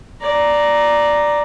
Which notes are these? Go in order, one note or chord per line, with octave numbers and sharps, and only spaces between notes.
D5 A#5